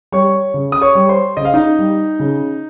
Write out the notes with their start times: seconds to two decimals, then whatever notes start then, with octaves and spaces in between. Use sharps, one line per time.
0.12 G3 C#5 C#6
0.54 C#3
0.72 D#6
0.82 C#5 C#6
0.95 G3
1.09 C5 C6
1.37 C#3 D#5
1.45 F5
1.54 D#4 D#5
1.79 G3
2.19 C#3